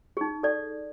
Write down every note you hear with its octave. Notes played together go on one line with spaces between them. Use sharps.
D#4 G#4
A4 D5